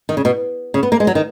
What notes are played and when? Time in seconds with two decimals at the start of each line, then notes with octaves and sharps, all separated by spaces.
0.09 D#3
0.17 C#3
0.25 B2
0.74 C#3
0.83 B3
0.92 A#3
1.00 G#3
1.07 F#3
1.15 D#3